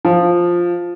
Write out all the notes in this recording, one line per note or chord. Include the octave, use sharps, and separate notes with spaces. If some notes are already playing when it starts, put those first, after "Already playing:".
F3